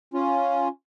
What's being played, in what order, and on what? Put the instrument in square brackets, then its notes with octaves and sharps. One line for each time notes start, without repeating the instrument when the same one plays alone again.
[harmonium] C#4 F4